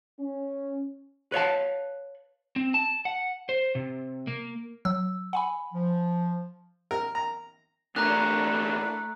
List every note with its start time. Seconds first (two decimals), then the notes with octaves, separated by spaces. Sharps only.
0.20 C#4
1.32 B4 C#5 F5 A5
2.56 C4
2.74 A5
3.05 F#5
3.49 C5
3.75 C3
4.27 A#3
4.85 F#3 E6
5.33 F#5 G#5 B5
5.73 F3
6.91 A#4
7.15 A#5
7.96 E2 A3 A#3 D4 B4 A#5 F#6